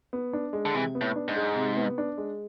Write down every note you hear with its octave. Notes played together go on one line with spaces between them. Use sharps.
B3
D4
G#3
D3
C3 E3
B3
A2
D4
G#2
G#3
C3
B3
D4
G#3